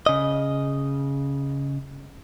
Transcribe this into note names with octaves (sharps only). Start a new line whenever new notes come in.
C#3 D#5